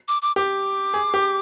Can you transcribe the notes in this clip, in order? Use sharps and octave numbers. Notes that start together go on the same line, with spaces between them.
D6
D6
G4 D6
G#4
G4